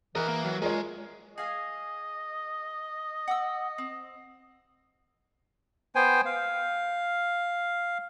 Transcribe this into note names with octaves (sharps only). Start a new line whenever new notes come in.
E3 A#4 D#5 F#5
A#3
F#3
C#3 G#3 F4 A#4 C#5
G#4 D#5 F5 G#5
F#5 D6 E6
C4
B3 C5 G5 G#5
F5